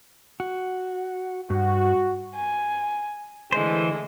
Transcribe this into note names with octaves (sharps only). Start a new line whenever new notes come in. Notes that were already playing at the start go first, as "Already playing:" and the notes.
F#4
G2 F#4
G#5
D3 E3 G#3 A3 C5